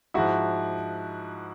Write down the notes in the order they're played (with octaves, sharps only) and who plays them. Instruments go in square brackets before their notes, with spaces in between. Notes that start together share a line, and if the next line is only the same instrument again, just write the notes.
[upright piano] G#2 F3 E4 F#4